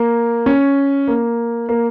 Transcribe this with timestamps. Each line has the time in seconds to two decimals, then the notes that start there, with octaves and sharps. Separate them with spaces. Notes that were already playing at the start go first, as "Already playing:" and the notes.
Already playing: A#3
0.46 C#4
1.08 A#3
1.69 A#3